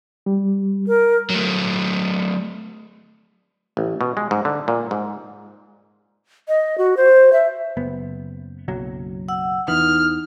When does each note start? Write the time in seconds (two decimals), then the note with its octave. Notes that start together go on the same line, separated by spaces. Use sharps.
0.26 G3
0.88 A#4
1.30 F#3 A3
3.77 A1
4.01 B2
4.17 G#3
4.31 G#2
4.45 D3
4.68 A#2
4.91 G#2
6.48 D#5
6.78 F#4
6.97 C5
7.33 E5
7.77 F#1 B3
8.68 F#1 B1 F#3
9.29 F#5 E6
9.68 E2 E3 D#4 F6